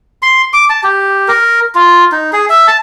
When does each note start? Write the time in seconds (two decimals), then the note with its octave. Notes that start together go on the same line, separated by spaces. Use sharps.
0.22 C6
0.53 D6
0.69 A5
0.83 G4
1.28 A#4
1.75 F4
2.12 D#4
2.33 G#4
2.50 E5
2.67 A5